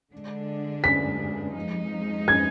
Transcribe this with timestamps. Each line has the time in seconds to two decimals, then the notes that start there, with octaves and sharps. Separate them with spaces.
0.13 D3 G#3 D4
0.84 B6
1.55 F2 F3 G#3 D#4
2.28 G#6